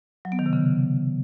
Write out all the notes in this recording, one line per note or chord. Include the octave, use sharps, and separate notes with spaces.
F#3
B3
D#3
C3
C#3